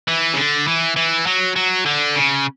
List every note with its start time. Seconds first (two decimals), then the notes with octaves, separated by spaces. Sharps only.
0.08 E3
0.33 C#3
0.37 D3
0.68 E3
0.96 E3
1.27 F#3
1.56 F#3
1.86 D3
2.15 C#3